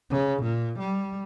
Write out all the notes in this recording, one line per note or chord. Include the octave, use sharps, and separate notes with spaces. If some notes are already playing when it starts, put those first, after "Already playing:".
C#3
A#2
G3